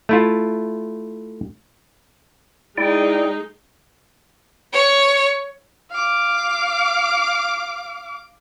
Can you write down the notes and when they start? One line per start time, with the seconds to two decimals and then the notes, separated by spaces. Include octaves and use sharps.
0.09 A3 E4 F4
2.78 G#3 D#4 E4 D5 G5
4.73 C#5
5.91 F5 D6